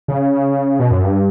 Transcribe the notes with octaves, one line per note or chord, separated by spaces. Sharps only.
C#3
B2
F#2
G2